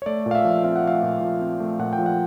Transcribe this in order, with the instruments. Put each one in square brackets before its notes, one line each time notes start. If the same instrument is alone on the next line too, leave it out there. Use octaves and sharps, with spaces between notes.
[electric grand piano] C#5
A3 D5
A#2
F5
E5
F3
C4 F5
F#5
A3 F5
A#2
F3
C4
A3
A#2 F#5
G5
F3
F#5